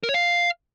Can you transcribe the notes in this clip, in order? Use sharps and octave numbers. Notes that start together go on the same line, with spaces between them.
A#4
C#5
F5